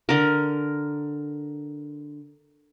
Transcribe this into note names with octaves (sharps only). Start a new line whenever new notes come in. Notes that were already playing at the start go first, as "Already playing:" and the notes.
D3 A#4